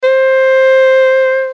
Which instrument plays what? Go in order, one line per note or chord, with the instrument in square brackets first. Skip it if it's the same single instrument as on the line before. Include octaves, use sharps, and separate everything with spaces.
[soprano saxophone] C5